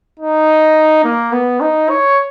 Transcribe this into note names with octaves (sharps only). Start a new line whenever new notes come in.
D#4
A#3
B3
D#4
C#5